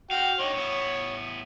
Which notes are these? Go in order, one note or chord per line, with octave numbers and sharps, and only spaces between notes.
F#4 F5 G5
D4 D#4 C#5
A2 B3